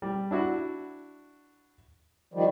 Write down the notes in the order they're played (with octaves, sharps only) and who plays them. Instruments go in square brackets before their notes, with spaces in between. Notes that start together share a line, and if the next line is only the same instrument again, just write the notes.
[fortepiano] G3
D4 E4 F#4
[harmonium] D#3 F3 G3